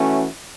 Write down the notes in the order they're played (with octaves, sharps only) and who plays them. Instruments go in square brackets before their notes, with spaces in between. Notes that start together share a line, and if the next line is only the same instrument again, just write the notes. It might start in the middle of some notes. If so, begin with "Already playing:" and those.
Already playing: [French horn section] E3 A3 C#4 F#4